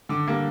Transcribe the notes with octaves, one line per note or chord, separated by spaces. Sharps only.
D3 D6
G3 A#3